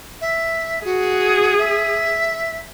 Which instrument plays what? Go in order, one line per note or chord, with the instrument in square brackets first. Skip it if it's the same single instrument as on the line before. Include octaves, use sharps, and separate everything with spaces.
[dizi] E5
[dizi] F#4 [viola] G#4
[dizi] E5